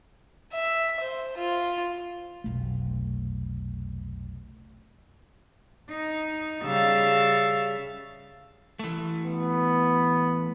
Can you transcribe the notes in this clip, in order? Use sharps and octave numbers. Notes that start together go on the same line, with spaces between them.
E5
C5
F4
F1 B1 A3
D#4
C#3 G3 E5 F5 A5
E3 A3
B3